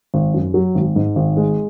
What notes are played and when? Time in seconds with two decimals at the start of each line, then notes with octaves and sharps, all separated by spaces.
0.14 G#1
0.34 F#2
0.54 F#3
0.75 G#1
0.96 G#2
1.16 G#1
1.37 G#3